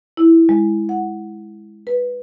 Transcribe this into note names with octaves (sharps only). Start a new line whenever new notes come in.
E4
G#3
F#5
B4